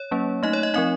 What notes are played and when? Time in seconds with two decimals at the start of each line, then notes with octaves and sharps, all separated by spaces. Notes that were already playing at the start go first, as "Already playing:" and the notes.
Already playing: C#5
0.11 F#3 A#3 C#4
0.43 A3 D#4 D#5
0.53 C#5
0.63 D#5
0.74 F3 C4 D#4 D#5